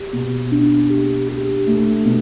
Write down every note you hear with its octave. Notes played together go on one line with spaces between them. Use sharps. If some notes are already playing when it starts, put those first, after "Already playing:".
Already playing: G4
B2
D4
G4
G4
A3
B2